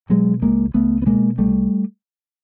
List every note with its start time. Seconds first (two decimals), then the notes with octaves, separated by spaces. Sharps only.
0.09 B2 F#3 G#3
0.42 C#2 G#3 A#3
0.74 C#2 A3 B3
1.02 B3
1.06 B2 G#3 A#3
1.38 C2 G3 A3